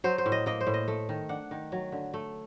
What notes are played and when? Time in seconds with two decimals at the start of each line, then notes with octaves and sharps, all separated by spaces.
0.04 F#3 C5
0.18 C5
0.26 A2
0.32 D#5
0.46 A#3 D#5
0.61 C5
0.67 A2
0.74 D#5
0.88 A3
1.09 D#3
1.29 D4 F#5
1.51 D#3
1.72 F#3
1.92 D3
2.14 A3